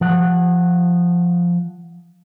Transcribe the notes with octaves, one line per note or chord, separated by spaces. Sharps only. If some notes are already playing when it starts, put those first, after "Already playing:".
F3 F#5